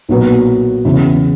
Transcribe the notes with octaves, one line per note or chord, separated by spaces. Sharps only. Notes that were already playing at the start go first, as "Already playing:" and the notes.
B1 A#2 F#3 B3
E2 C#3 E3